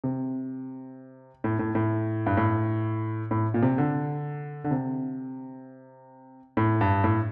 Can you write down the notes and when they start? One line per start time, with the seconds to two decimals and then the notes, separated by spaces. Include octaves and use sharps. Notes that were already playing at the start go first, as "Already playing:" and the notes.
0.04 C3
1.44 A2
1.59 A2
1.75 A2
2.26 G2
2.37 A2
3.31 A2
3.54 A#2
3.62 C3
3.78 D3
4.64 D3
4.71 C3
6.57 A2
6.81 G2
7.04 A2